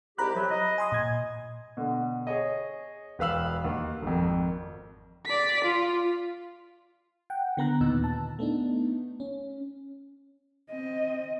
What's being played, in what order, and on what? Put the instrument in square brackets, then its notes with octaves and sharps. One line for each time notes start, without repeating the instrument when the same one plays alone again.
[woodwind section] C2 G#2 G4 [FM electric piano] A#5 B5 F#6
[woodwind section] C3 F3 F#3
D#5
[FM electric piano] G#5 C6 D#6
A#2 G#6
[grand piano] B2 D3
G#4 C#5 D#5
E1 B4 F5 E6 F#7
D#2
G#1 F2
[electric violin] D5 B6
F4
[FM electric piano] F#5 G5
D3 B3 A#5 F#6
D#2 A#2 D#4 E6
A5
A3 B3 D4 D#4
C#4
[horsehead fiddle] C4 D#5